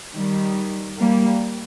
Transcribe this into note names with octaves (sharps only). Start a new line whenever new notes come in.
D#3 G3
G3 A#3